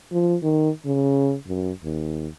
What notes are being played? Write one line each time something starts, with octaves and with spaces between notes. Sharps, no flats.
F3
D#3
C#3
F#2
D#2